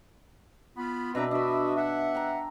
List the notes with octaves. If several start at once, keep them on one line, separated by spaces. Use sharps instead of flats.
B3 F4 B5
B2 C4 D4 B4 E5 A#5
D4 F#4 B4 D#5 E5
E5 F#5
G5 A#5